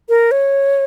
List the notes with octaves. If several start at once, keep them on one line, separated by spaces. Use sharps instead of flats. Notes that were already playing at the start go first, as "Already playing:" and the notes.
A#4
C#5